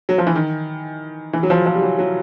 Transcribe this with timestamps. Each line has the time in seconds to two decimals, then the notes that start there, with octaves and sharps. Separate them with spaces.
0.09 F#3
0.18 F3
0.27 E3
0.35 D#3
1.33 E3
1.43 F#3
1.50 F3
1.66 F3
1.75 G3
1.82 F#3
1.98 F#3